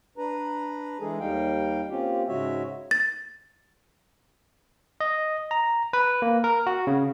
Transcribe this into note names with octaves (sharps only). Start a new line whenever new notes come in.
D4 B4 A#5
E3 G#3 D4 G#4 A4
D#2 G3 D#4 F5 G5
A#3 C4 C#4 F4 G4
G#2 C#3 G#3 F#4 C#5 E5
A6
D#5
A#5
B4
A#3
A#4
F#4
C#3